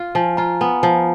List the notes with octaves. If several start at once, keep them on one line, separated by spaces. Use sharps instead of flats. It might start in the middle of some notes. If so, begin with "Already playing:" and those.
Already playing: F4
F3 G#5
F4 A#5
B3 G#5
F3